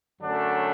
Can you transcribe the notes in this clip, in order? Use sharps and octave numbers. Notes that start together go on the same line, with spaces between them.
F#2 D3 F#3 A3 D4